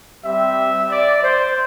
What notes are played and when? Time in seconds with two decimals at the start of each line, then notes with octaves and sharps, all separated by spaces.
0.24 G3 C4 G4 E5
0.90 D5
1.23 C5